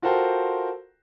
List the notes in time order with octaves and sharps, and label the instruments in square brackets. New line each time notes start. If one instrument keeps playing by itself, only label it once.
[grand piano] F4 F#4 A4 A#4 C5 G5